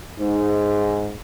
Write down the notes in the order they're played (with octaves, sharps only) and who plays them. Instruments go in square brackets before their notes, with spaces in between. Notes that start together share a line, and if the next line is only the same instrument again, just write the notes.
[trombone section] G#2